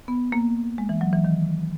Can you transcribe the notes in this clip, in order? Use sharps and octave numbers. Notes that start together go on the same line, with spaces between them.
B3
A#3
G#3
E3
F#3
E3
D#3